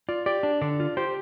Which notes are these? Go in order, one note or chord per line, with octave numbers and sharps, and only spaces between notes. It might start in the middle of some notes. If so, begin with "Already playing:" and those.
F4 D5
G4 D5
D4
D3 D5
F4
G4 C5